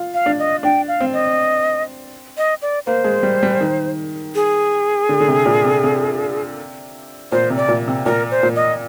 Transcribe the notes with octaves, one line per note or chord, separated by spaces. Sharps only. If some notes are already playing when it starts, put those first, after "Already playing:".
Already playing: F4
F5
D4
D#5
D4 G5
F5
C4
D#5
D#5
D5
A#3 C5
G#3
G3
G3
D#3
G#4
D3
D3
C3
A#2
C3
C3
A#2 C5
C3
D5
A#2
C3
A#2 A#4
C5
A#2
D#5